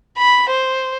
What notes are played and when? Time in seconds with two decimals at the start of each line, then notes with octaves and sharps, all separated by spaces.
0.19 B5
0.50 C5